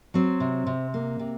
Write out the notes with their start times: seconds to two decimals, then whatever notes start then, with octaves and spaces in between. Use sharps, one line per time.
0.14 F#3 C4
0.40 C3
0.66 C3
0.94 A#3
1.19 C3